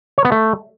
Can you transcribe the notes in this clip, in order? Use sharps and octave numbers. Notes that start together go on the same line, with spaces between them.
C#5
B3
A3